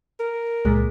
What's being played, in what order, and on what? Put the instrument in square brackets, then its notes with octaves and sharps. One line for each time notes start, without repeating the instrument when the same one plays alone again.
[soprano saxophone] A#4
[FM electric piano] C#2 A#2 [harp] G#3